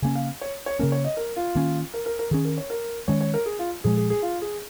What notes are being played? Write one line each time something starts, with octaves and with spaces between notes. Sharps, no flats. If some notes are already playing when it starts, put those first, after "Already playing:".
C#3 A#3 C#4 G#5
F5
C#5
C#5
C#3 A#3 C#4 A#4
C#5
D#5
A#4
F4
D#3 A#3 C#4
A#4
A#4
A#4
D#3 C#4 G#4
A#4
C#5
A#4
D#3 G#3 C#4 C#5
C#5
A#4
G#4
F4
A#2 F3 G#3 G#4
G#4
G#4
F4
G#4